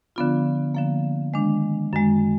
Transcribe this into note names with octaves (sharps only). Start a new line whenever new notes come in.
D3 F3 B3 D4 F4
D3 F3 A#3
D#3 G#3 D4
F#2 D#3 G#3